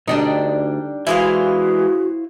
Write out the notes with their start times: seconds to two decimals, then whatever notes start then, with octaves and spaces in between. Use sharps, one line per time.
0.08 D2 G2 G3 D4 D#4
1.07 E3 G#3 E4 F#4 C5 F5